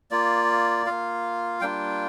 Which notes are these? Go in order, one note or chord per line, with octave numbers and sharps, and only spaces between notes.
A#3 F4 D5
A#3 F4 F5
G3 A#3 D4 F4 G5